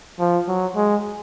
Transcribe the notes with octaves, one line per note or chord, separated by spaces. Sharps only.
F3
F#3
G#3